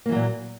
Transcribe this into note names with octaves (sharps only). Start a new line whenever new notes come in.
A#2 E3 F#3 A#3